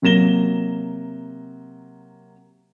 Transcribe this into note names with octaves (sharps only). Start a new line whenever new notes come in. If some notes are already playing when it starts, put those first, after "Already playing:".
C3 F#3 A#3 A#6 E7 G7